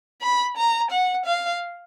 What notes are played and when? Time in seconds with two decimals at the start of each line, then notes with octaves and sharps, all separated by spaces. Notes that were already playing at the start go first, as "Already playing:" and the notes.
0.22 B5
0.57 A#5
0.91 F#5
1.26 F5